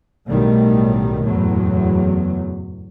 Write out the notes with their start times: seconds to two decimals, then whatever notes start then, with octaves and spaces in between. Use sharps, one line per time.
0.27 B1 A2 D#3 G3 A3
1.24 F#1 E2 A2 F#3